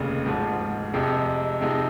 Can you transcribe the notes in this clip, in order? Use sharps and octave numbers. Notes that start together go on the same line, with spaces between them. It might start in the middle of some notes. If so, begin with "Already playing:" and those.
Already playing: F1 D#2 C#3
G#1 G#2 F3
F2 C3 F3 G#3
C3 F3 G#3 D#4